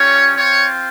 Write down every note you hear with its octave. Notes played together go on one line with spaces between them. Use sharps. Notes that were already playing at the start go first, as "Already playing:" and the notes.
Already playing: G3 C#4 F4 C#5
C4 F4 C#5